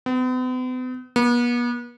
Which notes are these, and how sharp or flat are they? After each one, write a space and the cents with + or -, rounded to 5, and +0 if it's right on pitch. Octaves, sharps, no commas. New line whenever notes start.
B3 +45
B3 -40